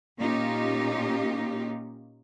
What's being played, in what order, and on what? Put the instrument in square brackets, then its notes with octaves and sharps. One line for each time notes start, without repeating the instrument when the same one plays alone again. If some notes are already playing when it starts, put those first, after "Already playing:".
[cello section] A#2 A#3 C#4 D#4 F4 G4